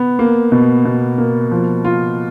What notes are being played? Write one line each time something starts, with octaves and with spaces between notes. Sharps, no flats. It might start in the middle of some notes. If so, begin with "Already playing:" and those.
Already playing: B3
A#3
B2
B2
A#3
F3
F4